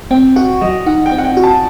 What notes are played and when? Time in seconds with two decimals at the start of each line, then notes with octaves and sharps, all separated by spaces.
0.11 C4 G5
0.36 F#4 F#5
0.61 F#3 D#5
0.86 D#4 F#5
1.06 G5
1.12 C4
1.18 F#5
1.24 G5
1.37 F#4
1.44 A5